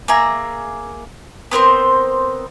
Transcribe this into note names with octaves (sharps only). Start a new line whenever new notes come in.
A#3 G#4 E5 A#5
B3 C4 A#4 C5